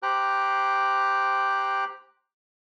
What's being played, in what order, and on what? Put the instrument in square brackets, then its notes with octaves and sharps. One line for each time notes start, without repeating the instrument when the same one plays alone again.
[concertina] G4 C5 G5 A#5 F#6